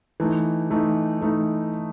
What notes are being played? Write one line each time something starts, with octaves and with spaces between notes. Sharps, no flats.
E3 A3 D#4
E3 A3 D#4
E3 A3 D#4